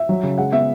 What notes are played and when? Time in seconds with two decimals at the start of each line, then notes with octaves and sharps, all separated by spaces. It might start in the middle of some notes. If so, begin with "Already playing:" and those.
Already playing: E5
0.09 F#3
0.23 C#3
0.38 G#3 F#5
0.52 B3 E5